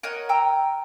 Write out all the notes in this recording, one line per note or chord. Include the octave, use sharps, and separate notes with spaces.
A#4 C#5 D#5 F#5
G5 A#5 E6